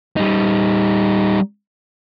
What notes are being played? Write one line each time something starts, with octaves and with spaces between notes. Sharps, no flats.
G3 D#4